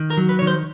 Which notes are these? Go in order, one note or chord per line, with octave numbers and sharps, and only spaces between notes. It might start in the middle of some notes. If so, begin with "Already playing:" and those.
Already playing: D#3
A#4
F#3
B4
D#3 C#5
C5